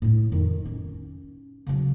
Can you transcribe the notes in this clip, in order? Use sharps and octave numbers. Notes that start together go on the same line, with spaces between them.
A2 E4
F2 D#3
C#4
C#3 F#3